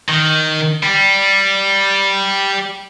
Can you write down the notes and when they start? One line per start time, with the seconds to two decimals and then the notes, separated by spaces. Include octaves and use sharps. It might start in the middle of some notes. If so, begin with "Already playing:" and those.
0.09 D#3
0.83 G3